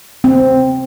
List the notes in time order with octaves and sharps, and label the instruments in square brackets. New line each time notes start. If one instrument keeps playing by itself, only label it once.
[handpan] C4